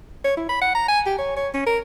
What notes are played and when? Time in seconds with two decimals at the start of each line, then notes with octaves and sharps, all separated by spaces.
0.24 C#5
0.37 E4
0.49 B5
0.61 F#5
0.75 A#5
0.88 G#5
1.06 G4
1.18 C#5
1.37 C#5
1.54 C#4
1.67 A#4